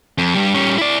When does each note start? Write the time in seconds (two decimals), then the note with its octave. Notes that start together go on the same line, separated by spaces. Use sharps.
0.18 F2
0.35 G2 G3
0.54 G3 C#4
0.78 E4 D5